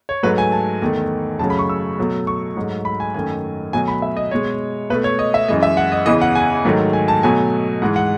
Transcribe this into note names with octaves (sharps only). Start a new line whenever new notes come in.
C#5
G#2 F#3 A3 B4
G#5
A5
E2 D#3 A3
F#2 C#3 F#3 A3 A5
B5
C#6
E6
B2 F#3 A3
C#6
G#2 F#3 A3
B5
G#5
F#2 D#3 A3 G#5
B2 F#3 A3 G#5
B5
E5
D#5
B2 G#3 C#5
B2 A3 B4
C#5
D#5
E5
F#2 E3 G#3 D#5
E5
F#5
D#5
E2 C#3 E3 D#5
F#5
G#5
G#2 D#3 F#3 A3
G#5
A5
B2 F#3 A3 G#5
G#2 E3 G#3 F#5
F#5